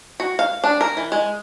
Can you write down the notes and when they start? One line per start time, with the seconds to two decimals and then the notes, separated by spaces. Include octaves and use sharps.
0.20 F#4
0.39 F5
0.64 D4
0.81 A#4
0.97 E3
1.12 G#3